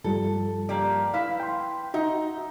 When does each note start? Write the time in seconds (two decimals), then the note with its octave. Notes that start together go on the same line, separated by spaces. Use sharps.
0.04 G2 F3 G3 A4
0.69 A#3 G4 D5
1.14 E4 B4 F5
1.40 G5 C6
1.94 D#4 F#4 E5